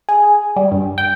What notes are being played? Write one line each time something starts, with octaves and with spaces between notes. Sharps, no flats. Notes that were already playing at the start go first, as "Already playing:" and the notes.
G#4
G3
G2
G5